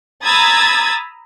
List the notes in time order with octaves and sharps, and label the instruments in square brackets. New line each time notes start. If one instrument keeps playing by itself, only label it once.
[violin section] A#5 B5 D#6 E6 G#6 A6